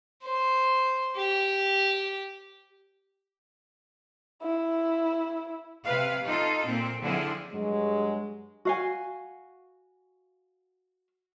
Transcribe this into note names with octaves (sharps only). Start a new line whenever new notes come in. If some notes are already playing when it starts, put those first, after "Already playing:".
C5
G4
E4
C3 B4 F5
D#4 F4 A4
A#2 C4
D3 F3 C4 E4 G#4
G2 F#3 G#3
F#4 F5 G#5